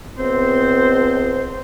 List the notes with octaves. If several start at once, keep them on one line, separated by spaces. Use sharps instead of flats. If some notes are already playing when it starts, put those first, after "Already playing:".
C#2 B3 C4 C5